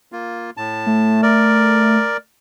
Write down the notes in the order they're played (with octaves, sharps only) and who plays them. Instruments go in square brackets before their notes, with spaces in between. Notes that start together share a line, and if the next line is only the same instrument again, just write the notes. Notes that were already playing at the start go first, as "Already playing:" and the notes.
[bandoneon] A#3 F4
A2 A5
[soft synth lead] A3
[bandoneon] A#4 D5